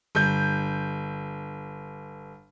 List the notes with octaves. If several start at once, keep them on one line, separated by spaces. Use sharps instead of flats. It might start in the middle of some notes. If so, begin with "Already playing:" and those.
G1 G6